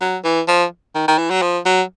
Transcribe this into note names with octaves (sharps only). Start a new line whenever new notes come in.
F#3
E3
F3
D#3
D#3
E3
F#3
F3
F#3